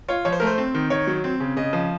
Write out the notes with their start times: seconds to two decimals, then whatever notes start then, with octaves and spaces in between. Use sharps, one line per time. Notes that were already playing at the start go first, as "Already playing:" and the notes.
0.08 F4 C#5
0.25 F3 C#5
0.32 C5
0.40 A3 A#4
0.47 C5
0.58 C4
0.74 D#3
0.90 D#3 C#5
1.07 F#3
1.24 C4
1.40 C#3
1.56 C#3 D#5
1.73 F3